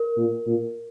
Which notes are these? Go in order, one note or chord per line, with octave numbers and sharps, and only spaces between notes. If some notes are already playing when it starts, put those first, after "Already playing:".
Already playing: A#4
A#2
A#2